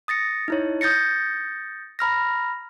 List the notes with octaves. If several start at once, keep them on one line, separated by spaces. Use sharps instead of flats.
D#6 A6 A#6 C#7
D#4 E4 C#5
D#6 G6 A6 A#6 C#7
A#5 B5 F6 A#6